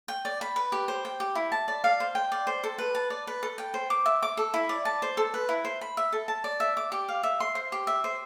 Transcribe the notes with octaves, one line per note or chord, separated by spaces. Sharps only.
G5
D5
B5
B4
G4
C5
G5
G4
E4
A5
D5
F5
C5
G5
D5
C5
A4
B4
A5
D5
B4
A4
G5
C5
D6
E5
D6
A4
E4
D5
A5
C5
A4
B4
E4
C5
B5
E5
A4
A5
D5
E5
D6
G4
F5
E5
C6
C5
G4
E5
C5